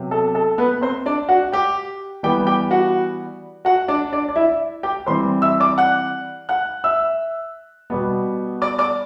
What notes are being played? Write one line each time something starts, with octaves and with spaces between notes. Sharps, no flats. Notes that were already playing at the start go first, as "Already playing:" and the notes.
Already playing: C3 F#3 B3
A4
A4
B3 B4
C4 C5
D4 D5
F#4 F#5
G4 G5
E3 G3 B3 G4 G5
G4 G5
F#4 F#5
F#4 F#5
D4 D5
D4 D5
D5
E4 E5
G4 G5
E3 G3 C4 C5 C6
E5 E6
D5 D6
F#5 F#6
F#5 F#6
E5 E6
B2 G3 B3
D5 D6
D5 D6